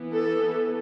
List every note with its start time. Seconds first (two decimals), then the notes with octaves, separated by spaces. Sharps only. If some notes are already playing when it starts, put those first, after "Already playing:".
Already playing: E3 B3
0.13 A4